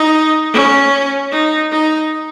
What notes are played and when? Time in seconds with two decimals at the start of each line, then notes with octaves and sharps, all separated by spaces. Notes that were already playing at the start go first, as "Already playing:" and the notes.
Already playing: D#4
0.54 C#4
1.31 D#4
1.71 D#4